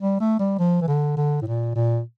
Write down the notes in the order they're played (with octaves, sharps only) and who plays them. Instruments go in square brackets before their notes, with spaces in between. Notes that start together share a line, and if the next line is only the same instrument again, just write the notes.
[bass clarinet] G3
A3
G3
F3
E3
D3
D3
A2
A#2
A#2